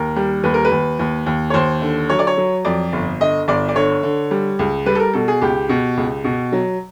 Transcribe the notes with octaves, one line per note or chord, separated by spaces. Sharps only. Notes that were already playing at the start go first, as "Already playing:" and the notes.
Already playing: D#2 A#4
G3
D#2 B4
A#4
B4
D#2
D#2
D#2
C#5
D#2 C5
D3
F#3 C#5
D5
C#5
F#3
F2 D5
G1
D3 D#5
G1 D5
D5
D3 C#5
D3
G3
C#2
G3 B4
A4
A#4
B2 A4
G#4
C#2 G4
B2
C#2
B2
F#3